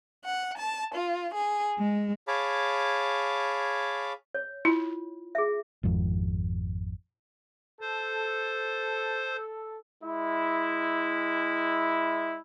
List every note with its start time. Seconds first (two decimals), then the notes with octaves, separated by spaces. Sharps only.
0.24 F#5
0.57 A5
0.94 F4
1.34 G#4
1.79 G#3
2.28 G#4 C#5 F5 A5 B5 D6
4.35 C#5
4.65 E4 F4
5.35 G#4 E5
5.83 G#1 F2
7.81 A4 C5
10.02 G#3 E4